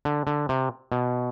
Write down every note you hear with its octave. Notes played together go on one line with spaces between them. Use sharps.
D3
D3
C3
B2